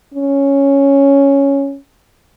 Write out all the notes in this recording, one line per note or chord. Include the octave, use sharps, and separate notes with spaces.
C#4